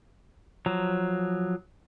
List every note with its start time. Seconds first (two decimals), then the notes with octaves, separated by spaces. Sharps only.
0.66 F3 F#3 A#5